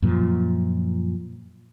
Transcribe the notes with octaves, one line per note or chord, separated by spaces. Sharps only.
F#2 A#2 F3